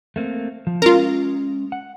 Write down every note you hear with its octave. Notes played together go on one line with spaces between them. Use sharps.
A3 A#3 C4
F3
G#3 C#4 F4 A#4
F#5